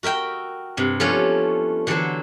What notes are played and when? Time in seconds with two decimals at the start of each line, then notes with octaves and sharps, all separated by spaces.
0.03 F#4 A#4 E5 G5
0.77 G2 C3
1.00 F3 A3 B3 C#4 D4 C#5
1.87 D3 E3 F#3 A4 C5